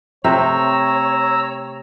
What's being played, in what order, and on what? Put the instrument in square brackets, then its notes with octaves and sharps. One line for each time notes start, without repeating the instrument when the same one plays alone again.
[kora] C3 A3 C4 [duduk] C#5 [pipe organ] A#5 E6